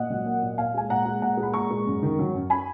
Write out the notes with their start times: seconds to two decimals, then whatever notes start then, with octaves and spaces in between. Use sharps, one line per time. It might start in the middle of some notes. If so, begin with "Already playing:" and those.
Already playing: A#2 D#5 F#5
0.10 F#3
0.25 A#3
0.42 A#2
0.58 A#2 F5 G#5
0.74 G#3 G#5
0.90 A#2 F#5 A#5
1.06 G#3
1.21 A#2 F#5 A#5
1.37 G#3
1.43 B5
1.54 A#2 A#5 C#6
1.71 G#3
1.86 F#2
2.03 D#3
2.19 F#3
2.34 F#2
2.50 G#5 B5